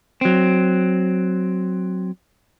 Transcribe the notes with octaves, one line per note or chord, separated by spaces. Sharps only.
F#3 C4